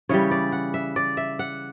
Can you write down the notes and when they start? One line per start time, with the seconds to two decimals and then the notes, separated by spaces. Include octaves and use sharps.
0.09 C#3 E3 G3 C#5
0.31 D5
0.52 F#5
0.74 E5
0.96 D5
1.17 E5
1.39 F#5